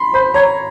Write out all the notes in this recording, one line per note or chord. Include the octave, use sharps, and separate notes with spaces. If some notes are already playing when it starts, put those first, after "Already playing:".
Already playing: B5 C6
C5 B5
C#5 A#5